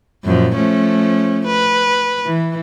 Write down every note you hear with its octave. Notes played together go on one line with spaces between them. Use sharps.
F#2 A#2 F3
F3 A3 C#4
B4
E3